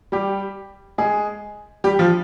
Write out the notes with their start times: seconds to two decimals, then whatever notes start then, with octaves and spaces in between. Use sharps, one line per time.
0.12 G3 G4
0.98 G#3 G#4
1.84 G3 G4
1.99 F3 F4